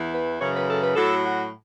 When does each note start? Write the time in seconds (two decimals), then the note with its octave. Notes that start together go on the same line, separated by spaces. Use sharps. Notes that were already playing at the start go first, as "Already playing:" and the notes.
Already playing: E2 E3
0.13 B4
0.40 F#2 C#3 E3 C#5
0.54 B4
0.68 A4
0.82 B4
0.95 A2 F#3 A4
1.23 F#4